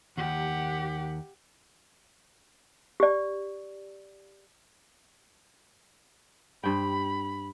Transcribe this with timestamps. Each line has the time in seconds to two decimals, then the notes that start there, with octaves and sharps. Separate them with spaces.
0.17 D#2 G4 F#5
3.00 G4 D5
6.64 G2 C4 G5 B5